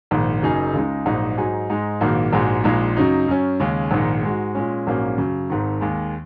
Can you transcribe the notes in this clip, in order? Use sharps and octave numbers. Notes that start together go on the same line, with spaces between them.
A#1 G#2 D#3
F#1 F#2 F#3 D#4 G#4
C#2 C#3 G#3 D#4
A#1 G#2 F#3 D#4 F#4
G#2 F#3 D#4 G#4
G#2 G#3 D#4
A#1 G#2 D#3 A#3 F#4
A#1 G#2 G#3 F#4
A#1 A#2 G#3 D#4 G#4
F#2 C#3 F#3 D#4
F#2 F#3 C#4
D#2 C#3 G#3 C#4
A#1 G#2 D#3 G#3
G#2 G#3 F#4
A#2 G#3 C#4
A#1 G#2 F#3 A#3 C#4
F#2 C#3 F#3
G#1 G#2 D#3
D#2 D#3 G#3